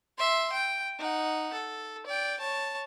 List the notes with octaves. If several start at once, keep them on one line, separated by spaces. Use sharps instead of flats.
E5 C6
G5
D#4 F#5
A4
D5 G5
C#5 A5